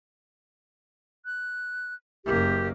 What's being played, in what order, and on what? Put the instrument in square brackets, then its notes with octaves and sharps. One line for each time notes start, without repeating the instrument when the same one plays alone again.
[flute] F#6
[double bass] F#1 A#3 [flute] G4